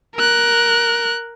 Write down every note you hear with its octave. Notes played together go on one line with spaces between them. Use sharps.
A#4 F#6